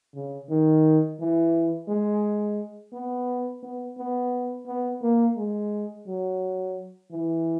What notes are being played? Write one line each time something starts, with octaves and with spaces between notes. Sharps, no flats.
C#3
D#3
E3
G#3
B3
B3
B3
B3
A#3
G#3
F#3
E3